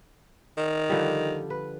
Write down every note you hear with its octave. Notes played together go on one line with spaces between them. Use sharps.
D#3
D3 F3 G3
B4